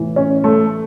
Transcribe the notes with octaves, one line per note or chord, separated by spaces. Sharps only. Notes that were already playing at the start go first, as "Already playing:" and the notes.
Already playing: A2 E3
C#4
A3